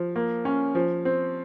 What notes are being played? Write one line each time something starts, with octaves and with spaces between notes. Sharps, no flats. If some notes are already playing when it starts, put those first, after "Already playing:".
Already playing: F3
A#3
C#4
F3
C4